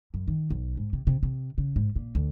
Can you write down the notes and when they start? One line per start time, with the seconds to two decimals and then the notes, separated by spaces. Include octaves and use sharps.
0.14 F#2
0.28 D#3
0.50 B1
0.77 G#2
0.93 C3
1.07 C3
1.23 C3
1.58 C#3
1.76 G#2
1.96 A#2
2.15 D2